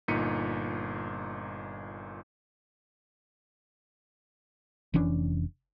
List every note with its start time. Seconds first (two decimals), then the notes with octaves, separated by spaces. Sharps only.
0.08 G1 A#2 D#4 B6 C#7 D#7
4.94 F1 E3 C#4 D4